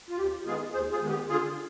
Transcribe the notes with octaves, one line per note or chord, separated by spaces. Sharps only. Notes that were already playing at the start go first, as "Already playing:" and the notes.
F4
D#2 G4
D#3 G#3 B3 F4 G#4
D#2 G#4 C5
F4 G#4
D#3 G#3 B3
G4
D3 F4 G#4